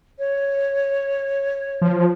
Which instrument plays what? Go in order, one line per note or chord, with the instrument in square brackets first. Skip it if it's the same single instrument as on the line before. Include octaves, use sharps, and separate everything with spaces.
[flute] C#5
[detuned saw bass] F3